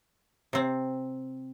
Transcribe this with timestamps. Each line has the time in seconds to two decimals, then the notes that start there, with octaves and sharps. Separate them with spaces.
0.53 C3 C4